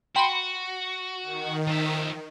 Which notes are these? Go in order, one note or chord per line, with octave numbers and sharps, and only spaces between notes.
F#4 G5 B5 C6
D#3
F3 E5